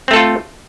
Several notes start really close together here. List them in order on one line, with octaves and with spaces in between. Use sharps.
C4 A3 A4 F4